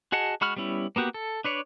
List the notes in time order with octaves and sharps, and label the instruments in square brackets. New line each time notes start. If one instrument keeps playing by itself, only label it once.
[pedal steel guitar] F#4 G#4 D#5 F#5 A5
G#3 F#4 B5 C#6 F6
G3 B3 C#4 E4
A#3 B3 F#4 G4
A4
D4 B4 C#5 D5